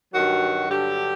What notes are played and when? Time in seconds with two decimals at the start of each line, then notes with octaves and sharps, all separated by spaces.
0.13 G2 D#3 F#3 F#4
0.68 G2 D3 F#3 G4